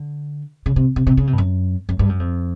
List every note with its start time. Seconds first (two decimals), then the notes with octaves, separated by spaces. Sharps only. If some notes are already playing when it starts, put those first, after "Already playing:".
Already playing: D3
0.66 C#3
0.76 C3
0.96 C3
1.07 C3
1.17 C#3
1.27 C3
1.33 G2
1.38 F#2
1.89 F#2
1.99 G2
2.09 F#2
2.19 F2